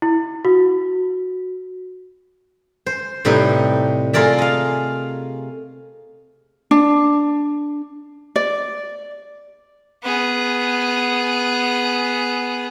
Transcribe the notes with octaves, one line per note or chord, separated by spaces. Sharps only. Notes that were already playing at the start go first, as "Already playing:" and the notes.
E4
F#4
C5
A2 C3 G3 D#4 B4
A3 F4 G#4 A#4 D5 E5
D#5 F5
D4
D5
B3 G#4